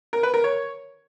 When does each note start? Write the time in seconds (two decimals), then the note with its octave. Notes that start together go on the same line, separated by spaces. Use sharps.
0.13 A#4
0.23 B4
0.34 A#4
0.44 C#5